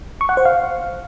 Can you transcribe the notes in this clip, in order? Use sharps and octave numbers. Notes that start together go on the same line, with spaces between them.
C#6
F#5
C5
F5